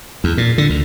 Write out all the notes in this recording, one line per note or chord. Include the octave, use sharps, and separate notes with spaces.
E2
A#2
D3
D2